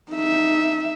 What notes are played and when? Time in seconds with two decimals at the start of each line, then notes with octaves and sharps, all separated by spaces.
0.12 D#4 E5